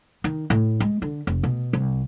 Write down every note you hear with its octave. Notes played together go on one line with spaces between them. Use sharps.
D#3
A2
G#3
D3
F1
B2
C2